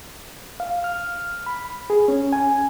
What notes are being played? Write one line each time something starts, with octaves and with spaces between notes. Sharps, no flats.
F5
F6
B5
G#4
C#4
G#5